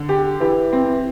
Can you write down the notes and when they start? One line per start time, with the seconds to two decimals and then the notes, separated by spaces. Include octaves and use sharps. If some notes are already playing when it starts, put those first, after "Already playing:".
Already playing: D3
0.09 G4
0.41 E3 G4
0.73 C4